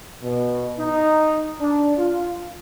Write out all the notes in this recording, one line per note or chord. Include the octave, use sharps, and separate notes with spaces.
B2
D#4
D4
F4